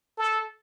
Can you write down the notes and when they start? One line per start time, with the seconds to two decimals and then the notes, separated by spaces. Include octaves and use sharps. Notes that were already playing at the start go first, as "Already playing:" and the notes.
0.18 A4